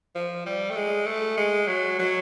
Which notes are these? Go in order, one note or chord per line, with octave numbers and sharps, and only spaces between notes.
F3
G3
A3
G#3
A3
G#3
F#3
F#3